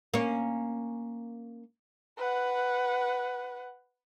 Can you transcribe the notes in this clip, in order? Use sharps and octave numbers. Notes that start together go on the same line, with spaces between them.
A#3 C#4
B4 F#5